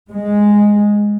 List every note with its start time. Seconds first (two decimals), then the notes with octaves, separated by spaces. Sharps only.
0.11 G#3